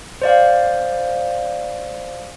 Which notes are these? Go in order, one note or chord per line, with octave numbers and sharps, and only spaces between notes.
C5 D5 F5